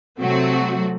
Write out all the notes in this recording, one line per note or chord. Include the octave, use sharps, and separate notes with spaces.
C3 F#3 A3 C4 F#4